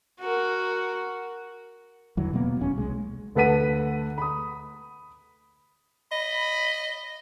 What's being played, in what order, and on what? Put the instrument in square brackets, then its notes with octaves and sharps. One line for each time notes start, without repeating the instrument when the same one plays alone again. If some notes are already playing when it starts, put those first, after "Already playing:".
[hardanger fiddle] F#4 A#4
[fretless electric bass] E2 D3 E3 F#3
B2 F#3 A#3 B3
F1 D#2 C#4
C2 G#3
[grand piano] D2 A4 B4 F#5 B6 D#7
B5 D#6
[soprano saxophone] D#5 [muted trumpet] B5